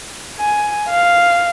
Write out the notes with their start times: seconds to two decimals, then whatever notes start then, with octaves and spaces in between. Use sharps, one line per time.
0.39 G#5
0.89 F5